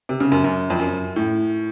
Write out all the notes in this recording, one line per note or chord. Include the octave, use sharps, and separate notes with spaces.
C3
C#3
F#2
F#2
F2
F#2
A2